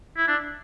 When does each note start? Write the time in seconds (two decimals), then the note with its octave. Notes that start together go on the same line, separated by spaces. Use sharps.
0.17 E4
0.28 D4